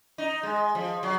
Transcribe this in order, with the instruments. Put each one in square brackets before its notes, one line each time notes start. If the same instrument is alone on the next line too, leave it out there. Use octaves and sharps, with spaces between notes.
[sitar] D#4
G#3
F3
F#3